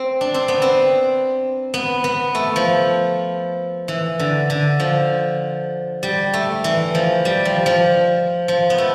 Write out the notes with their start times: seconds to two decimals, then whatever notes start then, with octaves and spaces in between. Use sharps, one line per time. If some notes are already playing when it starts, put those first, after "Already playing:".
Already playing: C4
0.21 D4
0.34 C4
0.48 B3
0.62 C4
1.74 B3
2.04 B3
2.35 A3
2.56 F3
3.88 E3
4.19 D3
4.50 D3
4.80 F3
6.03 G3
6.34 A3
6.64 E3
6.95 F3
7.25 G3
7.45 F3
7.66 F3
8.48 F3
8.70 B3
8.78 A3